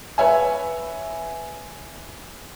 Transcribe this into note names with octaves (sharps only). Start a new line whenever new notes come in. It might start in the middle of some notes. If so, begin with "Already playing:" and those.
B4 C#5 E5 G#5